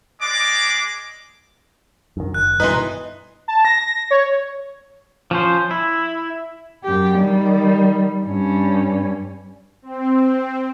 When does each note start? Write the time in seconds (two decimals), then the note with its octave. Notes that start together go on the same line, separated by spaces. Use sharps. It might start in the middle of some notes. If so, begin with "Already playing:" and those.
0.21 G#3 D5 D6
2.17 F#2 D#3
2.34 F#1 F#6
2.60 G2 B2 E3 D#4 B4 D#5 C6
3.48 A5
3.65 A#6
4.11 C#5
5.31 F3 C#4 C5
5.71 E4
6.84 F#2 G4
7.18 D#3 G3
8.26 G2 C#4
9.82 C4